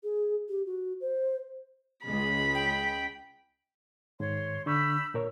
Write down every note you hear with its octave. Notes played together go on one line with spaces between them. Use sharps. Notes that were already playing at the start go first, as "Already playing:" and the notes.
G#4
G4
F#4
C5
C#2 G#3 B5
G5
G#2 D#3 C#5 C6
D3 D4 B5 C#6 E6 G6
A#2 A#4 C#5